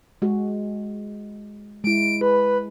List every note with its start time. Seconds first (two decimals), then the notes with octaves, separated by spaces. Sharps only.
0.22 G#3 F#4 G#4
1.84 G#3 E4 D7
2.21 G#4 B4